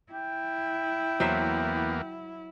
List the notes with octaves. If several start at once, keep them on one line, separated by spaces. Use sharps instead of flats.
E4 G5
E2 F#3 A#3 B3 C5 E5